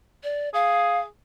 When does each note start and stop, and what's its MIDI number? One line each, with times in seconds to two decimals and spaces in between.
0.23 0.49 74
0.53 1.07 68
0.53 0.99 77